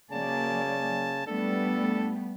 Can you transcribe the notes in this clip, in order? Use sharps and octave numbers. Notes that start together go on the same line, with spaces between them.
C#3 F#3 A#3 D5 G#5 A5
G3 A3 B3 D4 A4